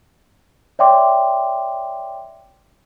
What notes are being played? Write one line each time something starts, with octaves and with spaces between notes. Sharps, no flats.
C#5 D5 E5 G5 C6 D6